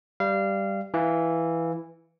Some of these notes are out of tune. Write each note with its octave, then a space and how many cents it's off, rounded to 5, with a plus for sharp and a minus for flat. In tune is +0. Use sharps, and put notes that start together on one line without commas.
G3 +0 F5 -25
E3 +0 F5 -5